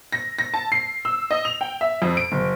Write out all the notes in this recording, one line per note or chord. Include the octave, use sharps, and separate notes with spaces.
A#6
A#6
A5
C7
E6
D#5
F7
G5
E5
F2
D7
F#1